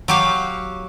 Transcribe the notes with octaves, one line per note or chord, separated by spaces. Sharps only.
F#3 G4 F5